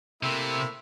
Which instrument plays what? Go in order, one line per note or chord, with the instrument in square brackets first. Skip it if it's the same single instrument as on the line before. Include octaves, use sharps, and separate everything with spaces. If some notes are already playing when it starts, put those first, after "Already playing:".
[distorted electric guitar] C3 [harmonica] A3 A#3 E4